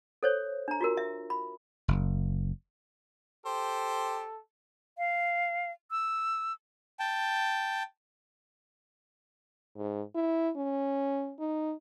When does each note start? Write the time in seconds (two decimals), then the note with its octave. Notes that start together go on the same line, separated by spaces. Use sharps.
0.23 A4 C5 C#5
0.68 D4 A#5
0.81 F4 F#4 A#4
0.97 E5
1.30 B5
1.88 F#1
3.46 G4 A4 C5
4.98 F5
5.91 E6
6.99 G5 A5
9.76 G#2
10.15 E4
10.56 C#4
11.39 D#4